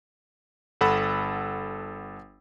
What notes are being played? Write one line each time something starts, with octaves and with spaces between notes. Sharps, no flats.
G1 A4 F#5 B5 E6